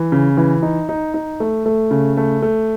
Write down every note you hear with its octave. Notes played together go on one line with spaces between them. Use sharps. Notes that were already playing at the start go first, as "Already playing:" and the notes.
Already playing: E3
C#3
E3
D#4
D#4
D#4
A3
A3
C#3
A3
A3